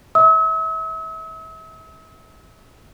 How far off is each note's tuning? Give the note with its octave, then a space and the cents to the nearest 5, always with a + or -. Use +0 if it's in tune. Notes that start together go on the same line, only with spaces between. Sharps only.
E5 -30 E6 -45